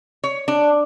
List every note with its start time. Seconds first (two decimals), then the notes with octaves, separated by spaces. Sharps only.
0.24 C#5
0.48 D4